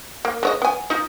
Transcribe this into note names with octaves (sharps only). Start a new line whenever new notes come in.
A#3
G#3 C#5 D#5
B3 G#5
D#4 F4 D#5